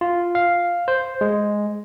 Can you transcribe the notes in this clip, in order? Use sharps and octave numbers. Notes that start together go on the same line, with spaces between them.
F4
F5
C5
G#3